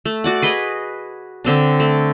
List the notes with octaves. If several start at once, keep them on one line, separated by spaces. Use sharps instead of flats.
A3
F#4 D5 F#5
G#4 B4 D#5
D3 C4 D4
A3